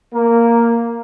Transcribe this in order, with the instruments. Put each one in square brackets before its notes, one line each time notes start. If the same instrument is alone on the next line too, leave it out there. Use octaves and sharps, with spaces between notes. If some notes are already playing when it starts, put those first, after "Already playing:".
[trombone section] A#3